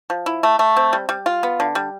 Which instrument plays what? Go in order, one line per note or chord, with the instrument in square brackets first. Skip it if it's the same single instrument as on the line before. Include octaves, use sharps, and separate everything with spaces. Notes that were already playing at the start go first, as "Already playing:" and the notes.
[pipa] F3
E4
A3
A3
C4
G3
G3
F4
B3
D3
G3